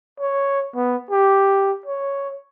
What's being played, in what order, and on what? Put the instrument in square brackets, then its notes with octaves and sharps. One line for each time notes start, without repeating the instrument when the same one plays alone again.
[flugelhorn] C#5
B3
G4
C#5